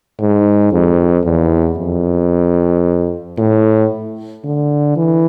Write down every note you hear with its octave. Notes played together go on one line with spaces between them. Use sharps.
G#2
F2
E2
F2
A2
D3
E3